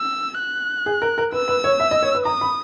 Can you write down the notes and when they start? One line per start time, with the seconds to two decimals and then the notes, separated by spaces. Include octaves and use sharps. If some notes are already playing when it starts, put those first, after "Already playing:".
Already playing: E6
0.39 F#6
0.86 G#4
1.02 A#4
1.18 A#4
1.32 B4 E6
1.48 B4
1.64 C#5
1.80 E5
1.91 D#5
2.03 C#5
2.15 B4
2.25 A#5 D#6
2.41 B5